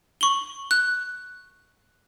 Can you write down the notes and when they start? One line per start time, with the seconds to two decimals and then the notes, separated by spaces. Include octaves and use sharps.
0.21 C#6 F#7 G7
0.71 F#6